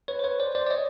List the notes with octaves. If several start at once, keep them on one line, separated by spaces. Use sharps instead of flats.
B4 C#5
C5
B4 C#5
C5 D5
C5 D5
D5
C#5 D#5